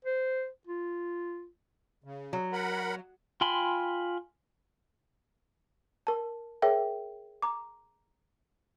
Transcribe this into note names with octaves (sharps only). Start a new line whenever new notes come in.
C5
F4
C#3
F#3
A#4 F#5 B5
F4 G5 G#5 B5 C6
A#4 A5
G#4 A#4 C#5 E5 G5
A#5 D6